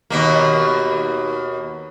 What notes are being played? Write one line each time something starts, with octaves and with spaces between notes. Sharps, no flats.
D#2 B2 A#3